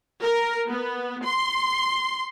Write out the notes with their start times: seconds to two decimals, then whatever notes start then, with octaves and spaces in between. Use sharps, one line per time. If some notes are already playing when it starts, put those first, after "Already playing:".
0.22 A#4
0.69 B3
1.24 C6